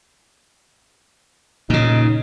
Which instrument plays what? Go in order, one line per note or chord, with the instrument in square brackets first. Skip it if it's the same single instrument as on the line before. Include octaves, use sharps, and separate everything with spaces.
[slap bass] A#2 C#3 [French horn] D#4